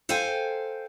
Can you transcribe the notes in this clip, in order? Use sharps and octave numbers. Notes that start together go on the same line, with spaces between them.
A4 C5 F5 G5 G#5